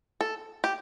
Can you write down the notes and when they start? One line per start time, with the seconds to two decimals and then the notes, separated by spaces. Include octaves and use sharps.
0.21 A4
0.64 G4